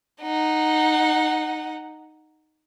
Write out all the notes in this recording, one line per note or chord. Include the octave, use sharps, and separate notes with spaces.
D#4 F#5